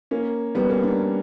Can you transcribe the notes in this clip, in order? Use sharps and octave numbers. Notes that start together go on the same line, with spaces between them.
A#3 C#4
G3 B3
A#3 C#4
B3 D4